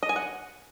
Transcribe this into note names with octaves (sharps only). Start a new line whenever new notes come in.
D#5
G#5
F#5